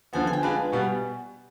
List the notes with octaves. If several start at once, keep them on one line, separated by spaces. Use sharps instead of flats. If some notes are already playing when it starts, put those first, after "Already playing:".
D3 F3 B3 G#5
G#5
G5
G#3 D4 F4 B4 G#5
B2 G3 B3